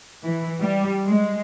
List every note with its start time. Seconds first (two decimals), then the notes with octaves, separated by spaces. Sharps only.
0.25 E3
0.61 G3
1.06 G#3